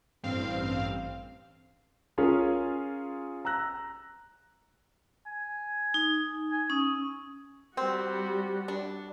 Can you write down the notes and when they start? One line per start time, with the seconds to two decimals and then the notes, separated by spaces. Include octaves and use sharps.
0.23 A1 G2 C4 F5
2.18 C#4 F4 G#4 A#4 C#5
3.45 A#5 E6 F#6 A#6
5.26 G#5
5.94 D#4
6.51 G#5
6.70 C#4 D#6
7.77 G3 C4 F#4
8.68 D4